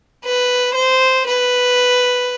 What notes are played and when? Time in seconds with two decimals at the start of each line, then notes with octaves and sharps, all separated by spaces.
0.25 B4
0.75 C5
1.27 B4